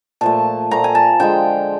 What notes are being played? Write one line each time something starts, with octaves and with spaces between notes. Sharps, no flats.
A#2 F3 A3 A5
A#2 F3 A3 A#5
G#5
A5
D3 F3 G#3 G5